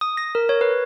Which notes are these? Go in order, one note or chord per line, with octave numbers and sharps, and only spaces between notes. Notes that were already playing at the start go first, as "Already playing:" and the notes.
D#6
A#6
A#4
C#5
B4